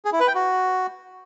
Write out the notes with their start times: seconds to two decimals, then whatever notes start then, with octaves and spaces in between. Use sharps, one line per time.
0.05 G#4
0.12 E4
0.20 B4
0.28 G5
0.35 F#4